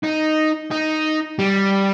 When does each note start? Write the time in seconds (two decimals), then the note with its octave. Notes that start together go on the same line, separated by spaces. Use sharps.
0.03 D#4
0.71 D#4
1.39 G3